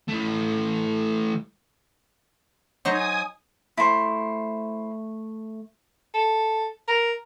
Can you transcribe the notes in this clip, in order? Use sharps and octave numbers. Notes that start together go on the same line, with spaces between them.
E3 A3
F#3 D#4 C5 G#5 D#6
A3 E4 C5
A4
A#4